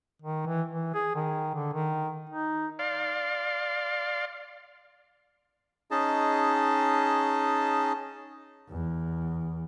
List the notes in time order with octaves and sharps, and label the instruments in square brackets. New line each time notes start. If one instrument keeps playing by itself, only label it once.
[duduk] D#3
E3
E3
G#4
D#3
D3
D#3
D#4
[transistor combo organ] D5 F5 C6
[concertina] C#4 D#4 G#4 D#5 A5
[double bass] E2